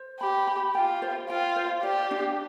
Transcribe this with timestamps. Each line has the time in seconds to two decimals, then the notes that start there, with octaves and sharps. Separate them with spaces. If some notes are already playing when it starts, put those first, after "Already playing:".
Already playing: C5
0.20 G4 B5
0.47 B5
0.75 F4 G5
1.02 C5
1.29 F4 G5
1.56 C5
1.83 G4 D5
2.11 D4